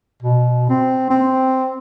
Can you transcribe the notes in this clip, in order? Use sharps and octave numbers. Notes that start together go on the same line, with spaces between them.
B2
C4
C4